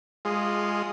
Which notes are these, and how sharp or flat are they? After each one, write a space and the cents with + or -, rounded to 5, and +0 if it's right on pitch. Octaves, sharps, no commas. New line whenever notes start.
G#3 -15 F4 +0 G#4 +0